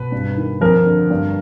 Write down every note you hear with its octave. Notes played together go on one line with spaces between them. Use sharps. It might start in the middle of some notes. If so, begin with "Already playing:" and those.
Already playing: B2 B4
G2
D#3
F2 A#4
D3
G2